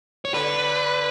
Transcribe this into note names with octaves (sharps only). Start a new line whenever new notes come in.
C#5
D3 B4